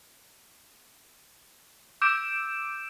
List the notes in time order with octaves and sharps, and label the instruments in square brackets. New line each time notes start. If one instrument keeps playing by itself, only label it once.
[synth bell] D6 E6 G6 D7 E7